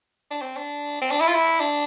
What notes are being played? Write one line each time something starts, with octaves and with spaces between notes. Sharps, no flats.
D4
C4
D4
C4
D4
E4
F4
E4
D4